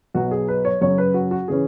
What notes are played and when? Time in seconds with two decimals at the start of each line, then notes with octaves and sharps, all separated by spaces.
0.14 B1 B2 F#3 B3 F#4
0.31 G#4
0.48 B4
0.65 C#5
0.81 F#2 C#3 F#3 C#4 C#5
0.98 B4
1.14 F#4
1.31 F#4
1.48 C#3 E3 C#4 G#4